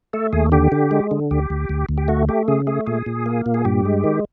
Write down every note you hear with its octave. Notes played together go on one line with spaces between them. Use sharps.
A3 A4
D#2 G#4
D3 G4
D3
G#3
D3
D2 G4
D2
D2
D2
G4
A3 F#4
A3 G4
C#3 G#4
A3 G#4
A#2 G#4
A#2
A#3
A#2
G#4
G2 G4
G#3
D#3